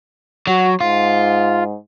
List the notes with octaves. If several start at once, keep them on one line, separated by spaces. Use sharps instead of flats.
F#3 F#4
G#2 F4